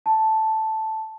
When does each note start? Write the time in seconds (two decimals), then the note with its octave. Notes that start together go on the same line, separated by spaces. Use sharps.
0.06 A5